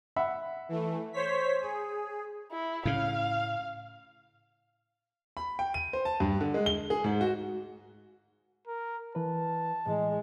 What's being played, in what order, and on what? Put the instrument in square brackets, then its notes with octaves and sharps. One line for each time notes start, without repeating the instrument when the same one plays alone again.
[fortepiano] E5 F#5 B5
[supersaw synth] E3 A3
C5 C#5 B6
G#4
[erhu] E4
[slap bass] A2 C#3 [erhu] F5
[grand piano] B5
G5
D#7
C5
A5
G2
D3
G#3
G7
G#4
G#2
F#4
[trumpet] A#4
[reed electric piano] E3 B4 [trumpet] A5
[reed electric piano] A2 E3 [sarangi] G#3